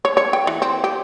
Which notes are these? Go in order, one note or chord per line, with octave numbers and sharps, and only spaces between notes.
C#5
C#5
G5
E3
C4
G4